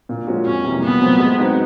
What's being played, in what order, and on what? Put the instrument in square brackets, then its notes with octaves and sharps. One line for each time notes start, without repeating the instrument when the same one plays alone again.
[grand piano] A#2
F3 G#3 C#4 F#4
[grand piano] F2 [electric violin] C#4
[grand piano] C3 E3 G3 A#3
[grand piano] A#2 [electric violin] B3
[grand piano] F#3 A3 C4
G#3
C4 D#4 F#4 B4